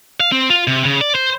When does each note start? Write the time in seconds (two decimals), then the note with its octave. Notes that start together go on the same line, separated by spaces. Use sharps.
0.20 F5
0.32 C4
0.50 F4
0.67 C3
0.86 C#3
1.01 D5
1.15 C5